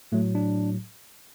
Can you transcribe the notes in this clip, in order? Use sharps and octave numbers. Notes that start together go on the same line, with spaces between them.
A2 F#3 A3
D4